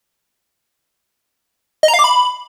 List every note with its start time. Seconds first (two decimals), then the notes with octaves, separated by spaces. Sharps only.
1.83 D#5
1.88 A#5
1.94 F5
1.99 D6
2.04 B5